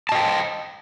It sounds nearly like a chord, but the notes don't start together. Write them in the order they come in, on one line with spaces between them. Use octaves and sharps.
A5 D#5 G5